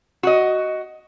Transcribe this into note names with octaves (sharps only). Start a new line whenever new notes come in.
F#4 D#5